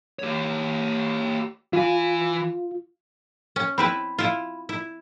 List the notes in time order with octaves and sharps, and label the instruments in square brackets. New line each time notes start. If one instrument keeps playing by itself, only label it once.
[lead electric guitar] G4 C#5
[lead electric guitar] E3 G#5 [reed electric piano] F4
[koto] C#4
[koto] C4 E4 B4 [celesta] B5
[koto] E4 F4
E4